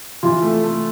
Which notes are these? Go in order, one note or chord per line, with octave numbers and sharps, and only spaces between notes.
E3 F4
A3
A3